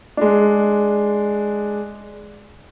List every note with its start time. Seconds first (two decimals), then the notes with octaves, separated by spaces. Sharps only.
0.17 G#3 D4